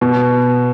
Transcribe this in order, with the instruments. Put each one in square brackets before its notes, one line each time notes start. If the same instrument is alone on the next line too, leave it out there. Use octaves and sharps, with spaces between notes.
[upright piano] B2